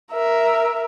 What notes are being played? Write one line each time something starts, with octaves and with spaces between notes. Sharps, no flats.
A#4 E5